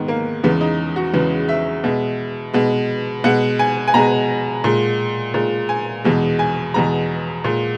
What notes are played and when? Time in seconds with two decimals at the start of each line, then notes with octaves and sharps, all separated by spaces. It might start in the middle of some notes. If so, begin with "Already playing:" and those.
Already playing: G#2 D#3 G#3 B3
0.08 A#3
0.43 E2 C#3 G#3 B3
0.61 D#4
0.96 F#4
1.14 E2 C#3 G#3 B4
1.49 E5
1.84 B2 G#3
2.54 B2 G#3
3.24 B2 G#3 F#5
3.59 G#5
3.88 G#5
3.94 B2 G#3 A#5
4.64 A#2 G#3
5.34 A#2 G#3
5.69 G#5
6.04 E2 B2 G#3
6.39 G#5
6.74 E2 B2 G#3 A#5
7.44 A#2 G#3